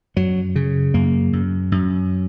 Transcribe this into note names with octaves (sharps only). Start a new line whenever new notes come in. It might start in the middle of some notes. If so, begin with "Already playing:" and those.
F#2 F#3
C#3
F#2 A#3
F#2
F#2